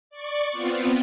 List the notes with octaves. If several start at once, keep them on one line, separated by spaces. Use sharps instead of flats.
D5 C#6
B3 C4 F4